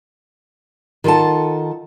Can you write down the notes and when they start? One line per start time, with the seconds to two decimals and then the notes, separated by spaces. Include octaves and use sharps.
1.04 D#3 F4 A4 F#5 A5